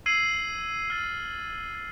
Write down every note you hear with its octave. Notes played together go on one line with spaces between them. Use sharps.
E6 G#6 C7 D#7 F#7
F6 A6 C7
A6